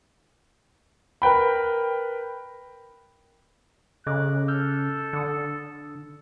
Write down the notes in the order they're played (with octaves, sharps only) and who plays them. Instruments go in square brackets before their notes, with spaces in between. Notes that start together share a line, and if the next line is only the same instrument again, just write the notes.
[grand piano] A#4 B4 G5 B5
[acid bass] C#3 [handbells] A4 D#5 D6 [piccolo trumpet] F#6
[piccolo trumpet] A4 [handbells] E6 F6 G6
[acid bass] D3 [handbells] D#6 C#7